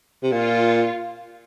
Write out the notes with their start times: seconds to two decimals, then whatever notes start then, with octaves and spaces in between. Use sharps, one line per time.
0.23 C3
0.32 A#2 F4